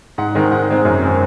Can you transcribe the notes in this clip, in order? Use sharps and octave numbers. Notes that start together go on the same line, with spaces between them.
G#2 F#5
D#3 G#3 C4
G#2 F#5
D#3 G#3 C4
F#2
D#3 G#3 C4